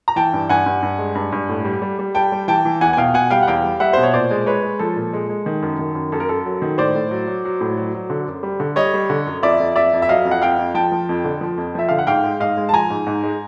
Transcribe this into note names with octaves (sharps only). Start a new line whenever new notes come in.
A#5
E3 G5 A5
G2
G2 F#5 G#5
G2
G2
G#3
G2
G2
A2
G3
G3
G3
G3 G5 A5
G3
E3 G5 A5
E3
E2 F#5 G#5
G#5
B2 F5 G5
B2 F#5 G#5
G3 F5 G5
F#5
E2 F5 G5
G3
G3 E5 F#5
B2 C5
C#5
A#2 C5 D5
G#3
G#3 B4 C#5
G#3
F3 A4
A#2
G#3
G#3
D#3
F#2
D#3
F#2
F#2 A4
A#4
F#2 A4
F#3
D#3
A2 C5 D5
A2
F#3
F#3
F#3
A2
F#3
F#3
D3
F#2
G3
D3
G3 C#5 D#5
G3
D3
F#2
F2 D5 E5
F2
F2 D5 E5
F2
E5
F#3 D#5 F5
F2
F#5
F2 F5 G5
F2
F3 G5 A5
F3
F2
D3
F3
F2
F3 E5
D3 F5
F#5
G#2 F5 G5
G#3
G#2 D#5 F5
G#3
A5
F3 G#5 A#5
G#2
G#2
G#3